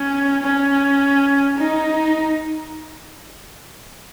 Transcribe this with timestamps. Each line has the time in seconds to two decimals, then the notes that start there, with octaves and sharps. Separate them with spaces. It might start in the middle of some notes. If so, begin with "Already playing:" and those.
Already playing: C#4
0.43 C#4
1.58 D#4